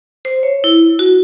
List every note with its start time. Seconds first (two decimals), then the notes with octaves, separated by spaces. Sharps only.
0.25 C5
0.43 C#5
0.64 E4
0.99 F#4